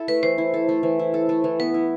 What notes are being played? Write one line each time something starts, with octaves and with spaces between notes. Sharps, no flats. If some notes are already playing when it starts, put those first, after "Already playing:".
Already playing: E4 A4
A3 B4
E3 C5
E4
A4
A3
E3
E4
A4
A3
E3
B3 B4
E4